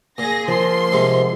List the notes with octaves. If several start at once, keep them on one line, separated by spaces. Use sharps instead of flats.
A#2 G#4 A#6
F3 A#4 C6
G#2 C3